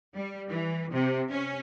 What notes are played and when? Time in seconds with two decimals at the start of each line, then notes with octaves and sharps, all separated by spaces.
0.14 G3
0.49 E3
0.92 C3
1.30 C#4